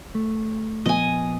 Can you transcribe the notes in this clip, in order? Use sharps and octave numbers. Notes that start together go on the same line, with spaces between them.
A3
A#2 F3 B3 D#5 G#5